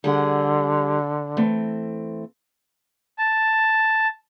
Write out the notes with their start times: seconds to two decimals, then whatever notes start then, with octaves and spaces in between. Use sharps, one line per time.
0.04 D3 G3 G#4 F#5
1.37 E3 A3 C4
3.18 A5